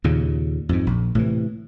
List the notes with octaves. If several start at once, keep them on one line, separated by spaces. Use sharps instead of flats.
D#2 A#2 C#3
F2 G#2
A#1
A2 C3 E3